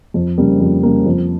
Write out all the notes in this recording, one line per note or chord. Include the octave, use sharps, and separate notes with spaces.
F2
C#3 G3 A#3
F2
C#3 G3 A#3
F2